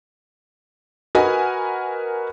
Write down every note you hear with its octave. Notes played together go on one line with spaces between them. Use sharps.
F#4 A#4 B4 D#5 F#5 G#5